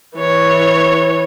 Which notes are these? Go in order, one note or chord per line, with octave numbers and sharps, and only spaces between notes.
E3 C#5